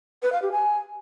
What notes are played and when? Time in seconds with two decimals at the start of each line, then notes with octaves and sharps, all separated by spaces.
0.23 B4
0.32 F5
0.42 G4
0.52 G#5